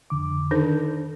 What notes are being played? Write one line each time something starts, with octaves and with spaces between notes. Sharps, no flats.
F2 D3 D6
D#3 D4 D#4 A4 C5